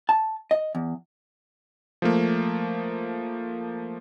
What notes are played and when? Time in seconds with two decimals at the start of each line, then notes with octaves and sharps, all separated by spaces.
0.09 A5
0.51 D#5
0.75 E2
2.02 F3 A3 A#3